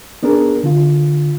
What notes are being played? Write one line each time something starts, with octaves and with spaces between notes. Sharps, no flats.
B3 D4 G#4 A#4
D3 F4